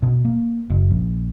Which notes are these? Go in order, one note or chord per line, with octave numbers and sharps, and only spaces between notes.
B2
A#3
F#1
A#1